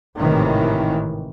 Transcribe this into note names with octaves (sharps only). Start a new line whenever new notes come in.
G#1 A2 C3 D#3 E3